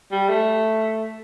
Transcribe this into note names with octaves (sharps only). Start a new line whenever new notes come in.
G3
A3